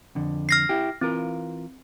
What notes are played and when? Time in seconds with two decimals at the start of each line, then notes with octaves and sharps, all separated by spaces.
0.15 F2 D3
0.49 F6 A#6 C7
0.69 E4 G4
1.01 E3 C4 F4 A#4